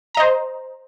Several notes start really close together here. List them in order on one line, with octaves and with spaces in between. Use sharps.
A#5 D#5 C5